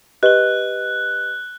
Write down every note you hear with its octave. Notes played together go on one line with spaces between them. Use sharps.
G4 B4 D#5 F#6 G7